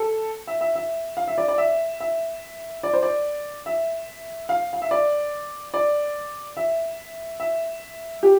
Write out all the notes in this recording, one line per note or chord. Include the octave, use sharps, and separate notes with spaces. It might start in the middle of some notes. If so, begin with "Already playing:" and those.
Already playing: A4
E5
E5
E5
F5
E5
D5
D5
E5
E5
D5
C5
D5
E5
F5
F5
E5
D5
D5
E5
E5
G4